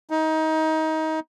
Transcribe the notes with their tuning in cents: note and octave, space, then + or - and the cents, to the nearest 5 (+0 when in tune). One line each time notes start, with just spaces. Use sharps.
D#4 +25